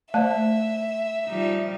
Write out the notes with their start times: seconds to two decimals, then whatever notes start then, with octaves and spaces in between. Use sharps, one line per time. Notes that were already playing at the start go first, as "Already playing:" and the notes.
0.14 A3 C5 D5 E5 A5
1.27 F3 G3 D#4